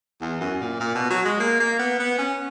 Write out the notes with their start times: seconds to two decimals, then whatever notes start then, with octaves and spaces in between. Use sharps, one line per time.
0.21 E2
0.41 F#2
0.61 A#2
0.80 A#2
0.95 B2
1.10 F#3
1.25 G#3
1.40 A#3
1.60 A#3
1.79 B3
1.99 B3
2.18 C#4